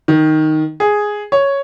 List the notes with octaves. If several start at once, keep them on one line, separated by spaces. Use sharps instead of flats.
D#3
G#4
C#5